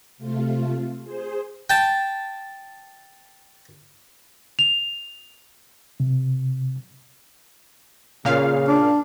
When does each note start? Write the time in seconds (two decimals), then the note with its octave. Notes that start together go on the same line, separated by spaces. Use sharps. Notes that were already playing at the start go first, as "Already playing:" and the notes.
0.18 C3 A3 F4
1.04 G#4 C5
1.70 G5 A5
4.59 F7
6.00 C3
8.25 A#2 C#3 F5
8.68 D4